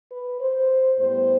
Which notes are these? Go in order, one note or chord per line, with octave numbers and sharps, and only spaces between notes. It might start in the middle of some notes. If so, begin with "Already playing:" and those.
B4
C5
A2 G3 B3 C5